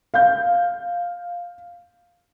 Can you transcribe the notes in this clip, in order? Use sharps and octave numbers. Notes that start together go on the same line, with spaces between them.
F5 G6